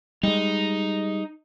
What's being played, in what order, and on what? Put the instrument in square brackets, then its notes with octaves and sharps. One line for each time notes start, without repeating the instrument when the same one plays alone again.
[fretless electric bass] G3 G#3 [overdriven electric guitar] D#4